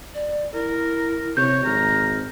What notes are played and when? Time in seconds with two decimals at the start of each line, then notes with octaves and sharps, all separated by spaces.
0.14 D5
0.54 E4 A#4
1.37 C3 C#5 G6
1.65 G#1 A#5 F6